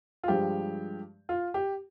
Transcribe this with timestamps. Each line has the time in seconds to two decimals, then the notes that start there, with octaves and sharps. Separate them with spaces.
0.24 F4
0.28 G2 F3 G#3 G4
1.29 F4
1.54 G4